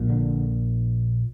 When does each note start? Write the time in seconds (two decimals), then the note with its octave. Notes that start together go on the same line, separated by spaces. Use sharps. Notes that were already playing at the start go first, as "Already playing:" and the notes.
Already playing: A#1 A#2
0.09 D3